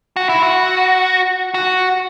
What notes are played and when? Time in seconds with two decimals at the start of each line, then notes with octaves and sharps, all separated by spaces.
0.16 F#4
0.29 E4
0.43 F#4
1.54 F#4